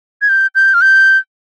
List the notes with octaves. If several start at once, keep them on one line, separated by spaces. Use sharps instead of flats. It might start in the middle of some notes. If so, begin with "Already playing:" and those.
G#6
G6
G6
F6
G6